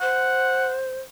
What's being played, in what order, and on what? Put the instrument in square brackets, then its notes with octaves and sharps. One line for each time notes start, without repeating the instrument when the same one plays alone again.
[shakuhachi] C5 [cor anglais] F#5